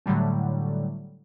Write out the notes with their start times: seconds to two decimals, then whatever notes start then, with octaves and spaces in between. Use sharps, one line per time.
0.06 A2 D3 F#3 G3 A3